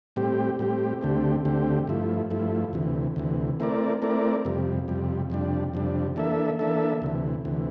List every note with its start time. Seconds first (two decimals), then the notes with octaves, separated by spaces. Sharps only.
0.16 A2 G3 C4 G4
0.59 A2 G3 C4 G4
1.01 D2 D3 A3 C4 G4
1.45 D2 D3 A3 C4 G4
1.87 G2 F3 A3 E4
2.30 G2 F3 A3 E4
2.73 D2 C3 E3
3.16 D2 C3 E3
3.60 A3 C4 E4 A#4 D5
4.02 A3 C4 E4 A#4 D5
4.45 F2 C3 G3
4.88 F2 C3 G3
5.30 F2 C3 G3 D4
5.74 F2 C3 G3 D4
6.16 E3 A#3 D4 A4 E5
6.59 E3 A#3 D4 A4 E5
7.02 D2 C3 E3
7.45 D2 C3 E3